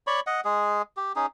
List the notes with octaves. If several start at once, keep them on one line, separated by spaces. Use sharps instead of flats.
C#5 D5 B5 C#6
D#5 F#5
G#3 G#4
G4
C#4 D#4 G#4